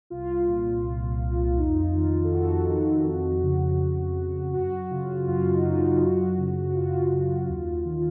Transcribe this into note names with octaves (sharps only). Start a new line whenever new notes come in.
C2 F4
A#2
C2
A#2
F2 D#4
F4
D#3
F4
A4
F2 F#4
D#3
F2
C#3
F2
C#3
F#2 F#4
C#3 F4
F#2 F4
D#4
C#3 F4
F4
F#2 F#4
C#3
F#4
F#2 F4
C#3
D#2
D#3